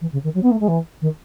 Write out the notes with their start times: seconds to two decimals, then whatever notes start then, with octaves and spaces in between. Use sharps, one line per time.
0.01 E3
0.12 C#3
0.23 D#3
0.34 F#3
0.43 B3
0.51 A3
0.60 G#3
0.68 E3
1.01 D#3